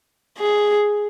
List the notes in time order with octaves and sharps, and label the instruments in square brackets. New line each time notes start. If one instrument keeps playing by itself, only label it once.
[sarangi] G#4